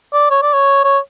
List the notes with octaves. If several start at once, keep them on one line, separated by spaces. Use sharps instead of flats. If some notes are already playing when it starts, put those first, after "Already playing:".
D5
C#5
D5
C#5
C#5